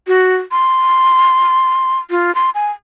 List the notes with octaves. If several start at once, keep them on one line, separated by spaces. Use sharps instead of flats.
F#4
C6
F4
C6
G#5